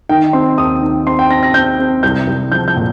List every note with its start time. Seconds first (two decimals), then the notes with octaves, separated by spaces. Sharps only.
0.09 D#3 G5
0.33 C4 C6
0.58 D#2 D#6
0.82 D#3
1.06 C4 C6
1.19 G5
1.30 C4 A#6
1.43 A#6
1.54 C4 G6
1.79 C4
2.03 C2 G6
2.27 C2
2.52 F3 G6
2.68 G6
2.76 A#2